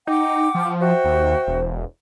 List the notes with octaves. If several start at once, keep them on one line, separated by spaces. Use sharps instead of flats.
D#4 F#5 G5 D6
F3
F#4 C5 E5 G5
D#2
E1